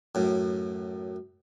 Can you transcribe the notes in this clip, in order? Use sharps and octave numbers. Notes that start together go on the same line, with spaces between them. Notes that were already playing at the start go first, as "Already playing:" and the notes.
F#2 A2